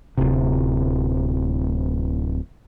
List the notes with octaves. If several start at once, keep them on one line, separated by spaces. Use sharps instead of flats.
D1 G1 C3